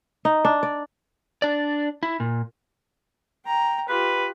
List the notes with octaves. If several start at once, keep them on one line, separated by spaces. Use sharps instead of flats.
D#4
D4
D5
D4 D5
E4
A#2
G5 A#5
F4 G4 B4